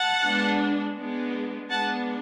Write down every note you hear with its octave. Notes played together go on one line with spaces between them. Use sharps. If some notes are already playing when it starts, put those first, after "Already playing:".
Already playing: F#5 A5
G#3 B3 D4
G#3 B3 D4
G#3 B3 D4 F#5 A5